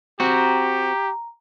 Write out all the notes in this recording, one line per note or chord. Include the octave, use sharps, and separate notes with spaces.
C4 F#4 G4 A#5